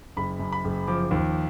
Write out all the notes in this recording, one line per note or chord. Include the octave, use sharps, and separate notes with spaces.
F#1 B5
F#2
B5
F#1
F3 D6
D#2